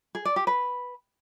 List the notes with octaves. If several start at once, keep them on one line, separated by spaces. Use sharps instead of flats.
G#4
D5
G4
B4